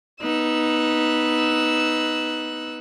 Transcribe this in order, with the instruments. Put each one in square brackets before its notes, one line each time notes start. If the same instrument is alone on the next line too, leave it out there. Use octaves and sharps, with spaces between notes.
[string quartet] B3 D#4 E6 F#6